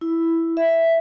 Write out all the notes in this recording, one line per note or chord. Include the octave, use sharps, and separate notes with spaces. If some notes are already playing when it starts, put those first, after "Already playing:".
E4
E5